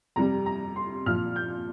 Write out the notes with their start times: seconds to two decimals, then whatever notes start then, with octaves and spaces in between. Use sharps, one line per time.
0.16 F2 C3 G3 A#5
0.46 A#5
0.76 C6
1.06 A#2 F3 F6
1.36 G6